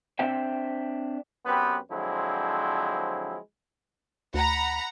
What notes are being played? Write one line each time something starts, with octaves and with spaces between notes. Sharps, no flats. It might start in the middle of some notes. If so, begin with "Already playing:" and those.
C4 D4 C5 E5 G5
F#2 B3 C4 G4 B4
D3 F3 F#3 G#3 C4 E4
D2 F#5 A#5 B5